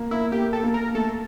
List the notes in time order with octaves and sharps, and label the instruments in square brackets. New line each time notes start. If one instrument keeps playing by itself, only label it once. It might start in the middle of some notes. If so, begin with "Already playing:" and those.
Already playing: [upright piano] A#3
[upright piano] A#3 [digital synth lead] E4
[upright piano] A#3 [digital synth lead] G4
[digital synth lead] A4
[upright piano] A#3
[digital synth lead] A#4
[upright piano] A3 [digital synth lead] A4